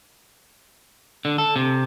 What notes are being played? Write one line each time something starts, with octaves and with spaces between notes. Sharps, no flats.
D3
A4
C3